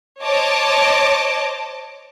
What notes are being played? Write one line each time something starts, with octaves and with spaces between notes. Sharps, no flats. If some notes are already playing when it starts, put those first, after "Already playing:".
C5 C#5 D#5 A5 D6